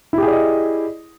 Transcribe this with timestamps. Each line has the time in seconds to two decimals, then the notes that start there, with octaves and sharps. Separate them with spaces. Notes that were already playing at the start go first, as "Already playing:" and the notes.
0.13 E4
0.18 G4
0.23 G#4
0.28 D5
0.32 D#5